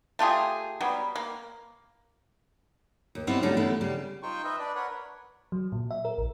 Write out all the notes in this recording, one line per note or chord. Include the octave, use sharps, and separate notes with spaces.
A3 F4 G4 G#4
F#3 G3 B3
A#3
D#2
G3 B3 C4 D#4 E4
D3 F#3 G3 A3 C#4 D#4
E3 G#3 A3 B3
C#3 G3
D#4 F4 C5 G5 C#6
B4 D#5 E5
D4 B4 D5
A#4 B4 C#5 F#5
F#3
A#2
E5
A#4
A#1